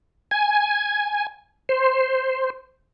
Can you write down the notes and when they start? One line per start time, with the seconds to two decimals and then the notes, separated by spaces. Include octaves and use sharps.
0.31 G#5
1.69 C5